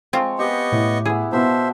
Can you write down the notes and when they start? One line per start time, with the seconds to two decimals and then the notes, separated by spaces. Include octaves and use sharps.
0.13 F3 G#3 C4 F4 C#6
0.39 B3 G4 D#5 C#6
0.72 A2
1.05 B3 E4 G#4
1.33 B2 B3 F4 C5 E5 A5